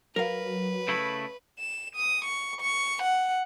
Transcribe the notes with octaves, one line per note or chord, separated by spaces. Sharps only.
F#3 A#4 B4 F5
C#3 A3 E4
E7
D#6
C#6
C#6
F#5